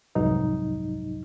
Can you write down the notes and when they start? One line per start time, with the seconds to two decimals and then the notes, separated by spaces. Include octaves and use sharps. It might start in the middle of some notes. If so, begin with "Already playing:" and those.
0.15 C2 F2 G#2 F#3 D#4